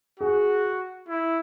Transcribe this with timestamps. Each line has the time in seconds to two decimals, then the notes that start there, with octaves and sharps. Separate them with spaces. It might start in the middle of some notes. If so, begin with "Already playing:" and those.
0.19 F#4 G#4
1.08 E4